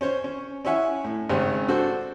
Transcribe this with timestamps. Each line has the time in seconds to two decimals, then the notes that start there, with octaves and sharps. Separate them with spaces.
0.01 C#4 C5 C#5
0.24 C#4
0.65 C#4 E4 C#5 E5 F#5 G#5
1.04 A2
1.30 G#1 C#3 C4 G4
1.68 D4 F#4 A4 C5